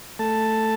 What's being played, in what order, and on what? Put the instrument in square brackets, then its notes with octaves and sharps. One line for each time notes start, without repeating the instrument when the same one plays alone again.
[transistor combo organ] A3 A5